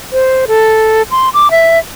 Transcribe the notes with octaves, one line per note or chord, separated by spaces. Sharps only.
C5
A4
C6
D6
E5